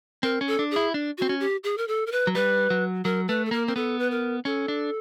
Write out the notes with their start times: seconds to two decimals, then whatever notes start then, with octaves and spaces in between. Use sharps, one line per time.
0.23 C4 A#4
0.41 C#4
0.47 A4
0.59 D4
0.71 G#4
0.76 E4
0.94 D4
1.18 C4 F#4
1.29 C#4
1.40 G4
1.64 G#4
1.78 A#4
1.88 A4
2.07 A#4
2.12 B4
2.27 F#3
2.35 G3 B4
2.70 F#3
3.05 F#3 A#4
3.28 A3 B4
3.45 A4
3.51 A#3 A#4
3.67 C4 A#4
3.76 B3 A4
3.99 B4
4.11 A#4
4.45 C#4 A4
4.68 D4